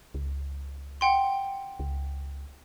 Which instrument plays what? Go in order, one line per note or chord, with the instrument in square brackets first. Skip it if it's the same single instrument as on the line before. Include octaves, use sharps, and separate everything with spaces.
[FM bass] C#2
[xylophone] F#5 G5 C6
[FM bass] C#2